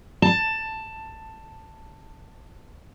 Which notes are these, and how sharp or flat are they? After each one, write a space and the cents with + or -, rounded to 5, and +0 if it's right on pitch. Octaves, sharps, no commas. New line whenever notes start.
A5 +10